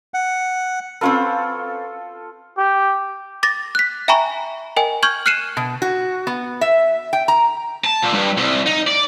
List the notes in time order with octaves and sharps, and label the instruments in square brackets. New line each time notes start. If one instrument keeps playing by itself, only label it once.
[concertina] F#5
[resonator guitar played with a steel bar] C4 C#4 B4 [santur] F4 A4
[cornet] G4
[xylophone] D6 A6 A#6
F#6 B6
E5 G5 G#5 A#5 B5 C#6
A#4 D#5 G5 G#5
C#6 F6 G6 G#6 F#7
F6 F#6 C7 C#7 D#7 E7
[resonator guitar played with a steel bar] B2
F#4
B3
E5
G5
A#5
[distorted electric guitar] A5
A#2
G2
C2
D#4
D5